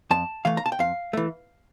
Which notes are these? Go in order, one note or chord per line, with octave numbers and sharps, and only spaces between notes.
F2 A5
E3 A3 F5
A#5
A5
G5
F2 F5
E3 A3